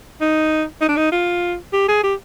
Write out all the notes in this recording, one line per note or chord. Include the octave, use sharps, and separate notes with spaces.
D#4
D#4
D4
D#4
F4
G4
G#4
G4